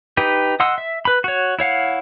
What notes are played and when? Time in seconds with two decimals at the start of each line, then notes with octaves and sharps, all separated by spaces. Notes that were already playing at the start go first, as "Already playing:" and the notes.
0.17 D#4 G4 B4
0.60 D#5 F#5 C6 E6
0.78 E5
1.05 B4 B5
1.24 F#4 C#5
1.59 E4 C#5 F5 F#5